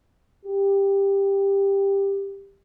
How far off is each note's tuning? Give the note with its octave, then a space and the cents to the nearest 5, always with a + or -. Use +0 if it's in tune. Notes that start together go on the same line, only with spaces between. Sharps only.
G4 +10